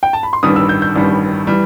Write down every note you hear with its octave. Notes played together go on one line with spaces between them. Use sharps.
G5
A5
B5
C6
A1 G2 D#3 G3 D#6
E6
G6
G6
A1 G2 D#3 G3
E3 G3